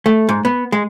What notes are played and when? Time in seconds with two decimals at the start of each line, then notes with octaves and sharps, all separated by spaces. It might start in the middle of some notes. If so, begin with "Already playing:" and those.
0.06 A3
0.29 G#2
0.45 B3
0.72 G#3